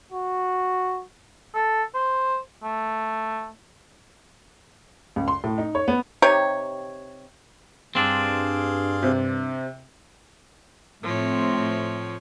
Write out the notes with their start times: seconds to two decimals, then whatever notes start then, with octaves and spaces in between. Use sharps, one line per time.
0.12 F#4
1.55 A4
1.95 C5
2.63 A3
5.16 C#2
5.28 C6
5.44 A2
5.58 D#4
5.75 C#5
5.88 B3
6.22 C3 D#4 G4 C#5
7.95 G2 C4 D4 G#4 F5 C6
9.03 C3
11.03 A2 F3 C4 C#5